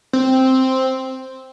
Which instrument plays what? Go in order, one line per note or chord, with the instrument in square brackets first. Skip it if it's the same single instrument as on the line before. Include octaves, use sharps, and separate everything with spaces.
[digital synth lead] C4